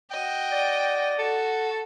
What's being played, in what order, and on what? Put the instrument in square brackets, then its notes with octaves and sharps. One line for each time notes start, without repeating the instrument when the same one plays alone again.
[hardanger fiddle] F#4 D#5 [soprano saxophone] G5
[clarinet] D5
[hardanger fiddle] F#4 [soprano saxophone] A4